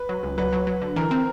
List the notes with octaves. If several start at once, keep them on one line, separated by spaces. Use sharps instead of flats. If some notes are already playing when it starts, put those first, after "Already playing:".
Already playing: B4
F#3
C#2
F#3 B4
F#3
F#3
D3
E3 A#4
C4